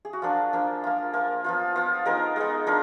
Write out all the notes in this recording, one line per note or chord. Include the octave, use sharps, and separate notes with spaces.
G#4
F#4
F3 A#3 D4 F4
F3 A#3 D4
A#3 F4
A#3 F4
F3 B3 F4
F3 B3 F4
G#3 B3 D#4 A#4
G#3 B3 D#4
G#3 D4 F4 A#4